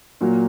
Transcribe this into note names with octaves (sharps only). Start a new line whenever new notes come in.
A#2 F#3 A#3